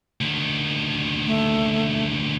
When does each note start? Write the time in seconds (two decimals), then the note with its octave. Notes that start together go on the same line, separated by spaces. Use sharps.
0.21 D2 D#3
1.26 A3